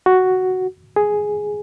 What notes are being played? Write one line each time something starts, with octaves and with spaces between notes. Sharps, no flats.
F#4
G#4